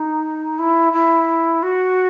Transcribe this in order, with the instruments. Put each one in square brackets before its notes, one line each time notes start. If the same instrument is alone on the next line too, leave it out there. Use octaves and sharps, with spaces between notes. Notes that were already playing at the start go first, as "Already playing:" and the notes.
Already playing: [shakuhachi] D#4
E4
E4
F#4